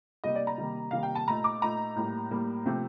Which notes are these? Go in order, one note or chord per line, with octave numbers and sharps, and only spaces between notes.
C3 G3 A#3 D#4 D#5
D5
A#5
C3 D#3 G3 A#3
C3 D#3 G3 A#3 F5
G5
A5
A#2 A3 D#4 A#5
D6
A#2 A3 D#4 A#5
A2 G3 A#3
A2 G3 A#3
C3 F3 A3 C4